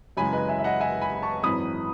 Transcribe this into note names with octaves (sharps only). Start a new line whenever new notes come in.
F#2 C#3 E3 G#3 G#5 B5
B4 D#5
E5 G#5
E5
D#5 F#5
E5 G#5
G#5 B5
B5
A5 C#6
G#1 F#2 E3 B5 D#6